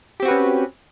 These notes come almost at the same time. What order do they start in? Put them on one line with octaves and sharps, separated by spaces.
G4 C4 F#4 B4 C#4